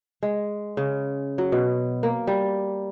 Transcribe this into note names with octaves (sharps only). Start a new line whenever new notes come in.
G#3
C#3
F#3
B2
A#3
G3